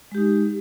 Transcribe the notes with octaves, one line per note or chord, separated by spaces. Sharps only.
G#3 D#4 G4